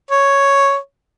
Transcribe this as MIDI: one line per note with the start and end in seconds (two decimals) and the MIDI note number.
0.11 0.77 73